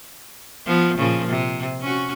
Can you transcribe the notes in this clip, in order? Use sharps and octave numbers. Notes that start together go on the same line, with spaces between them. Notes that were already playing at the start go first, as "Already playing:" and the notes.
F3 B3
A#2 C#3 F3
C3
C#4 F#4